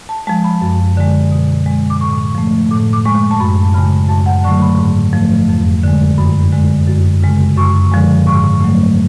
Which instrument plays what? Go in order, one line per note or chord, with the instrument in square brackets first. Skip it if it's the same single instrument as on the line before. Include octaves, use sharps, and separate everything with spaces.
[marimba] A5
F3 G#3 A5
B5
F#2
D3 G#3
B2
G#3
D6
A2 C#6
F3 A3
A2 D6
D6
G#3 C#6
A5
F#2 B5
C#3 G#3 B5
F#2 A5
F#5
D3 F#3 A3 C#6
B5
G#2
F3 A3
F2
D3 G#3
F#2 B5
D3 G#3
F#2
C#3 G#3
F#2 C#6
D3 F3 G#3
G#2 C#6
F#3 A3